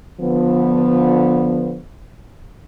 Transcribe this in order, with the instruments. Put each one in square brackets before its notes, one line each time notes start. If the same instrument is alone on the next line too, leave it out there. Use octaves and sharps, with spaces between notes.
[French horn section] D3 F3 B3